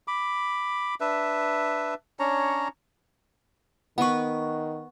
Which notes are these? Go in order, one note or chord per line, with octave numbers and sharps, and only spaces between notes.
B5 D6
D4 B4 E5
C#4 D4 C#5 A#5
D#3 B3 A#4 B4 F#5 C#6